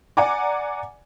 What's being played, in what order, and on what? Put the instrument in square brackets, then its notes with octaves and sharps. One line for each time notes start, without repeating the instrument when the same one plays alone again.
[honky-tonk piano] D5 F#5 G#5 A#5 D6